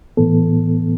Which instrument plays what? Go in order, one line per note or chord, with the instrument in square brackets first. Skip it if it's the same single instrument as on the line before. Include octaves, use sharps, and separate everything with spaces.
[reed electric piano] A2 E3 B3 A4